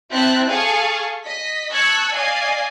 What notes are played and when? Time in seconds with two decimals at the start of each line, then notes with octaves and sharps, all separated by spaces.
0.11 C4 E4 E5 A5 F#6
0.48 G#4 A4 F5 C#6 D#6
1.24 D#5 B6
1.71 A5 C#6 E6 F#6 G#6 C#7
2.13 D5 D#5 F5 G#5 C7